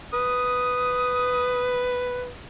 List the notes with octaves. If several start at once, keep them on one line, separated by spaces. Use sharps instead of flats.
B4 D#6